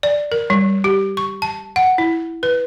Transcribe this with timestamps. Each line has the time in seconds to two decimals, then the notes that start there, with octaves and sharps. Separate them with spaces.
0.03 D5
0.32 A#4
0.50 G3
0.84 G4
1.17 C#6
1.42 A5
1.76 F#5
1.98 E4
2.43 B4